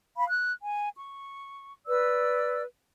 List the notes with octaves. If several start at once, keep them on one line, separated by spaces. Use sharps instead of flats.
F5 B5
F#6
G#5
C#6
B4 D5 E6